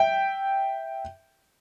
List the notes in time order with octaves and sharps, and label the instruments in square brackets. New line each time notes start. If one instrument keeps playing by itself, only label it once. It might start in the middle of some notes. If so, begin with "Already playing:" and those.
Already playing: [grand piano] E5 G5